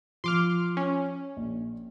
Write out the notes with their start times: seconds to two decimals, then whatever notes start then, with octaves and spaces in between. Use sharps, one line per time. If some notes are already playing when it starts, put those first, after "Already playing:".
0.24 F3 C6 D6 F6
0.77 C#4
1.37 A#1